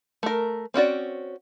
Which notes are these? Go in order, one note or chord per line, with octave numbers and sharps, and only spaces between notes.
A3 A#4
C4 C#4 F#4 D5